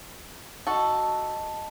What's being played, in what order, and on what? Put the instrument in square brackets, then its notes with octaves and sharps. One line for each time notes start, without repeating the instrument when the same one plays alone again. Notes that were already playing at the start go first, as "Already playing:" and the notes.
[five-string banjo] F#4 A4 [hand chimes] D#5 A5